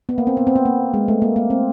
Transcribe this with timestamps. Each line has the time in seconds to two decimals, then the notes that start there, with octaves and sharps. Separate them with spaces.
0.09 B3
0.18 A#3
0.27 C4
0.37 B3
0.47 C4
0.56 B3
0.65 A#3
0.94 G#3
1.08 A3
1.22 A#3
1.36 A#3
1.50 C4